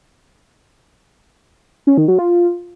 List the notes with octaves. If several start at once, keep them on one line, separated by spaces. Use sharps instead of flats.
C#4
D#3
F#3
F4